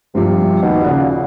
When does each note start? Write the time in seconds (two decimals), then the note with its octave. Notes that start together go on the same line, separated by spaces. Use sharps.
0.15 G2 C3 F3
0.62 D#2 B2
0.84 A#2 C#3 F#5